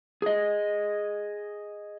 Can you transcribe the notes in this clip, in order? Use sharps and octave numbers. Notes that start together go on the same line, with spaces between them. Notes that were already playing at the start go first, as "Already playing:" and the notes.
G#4 D#5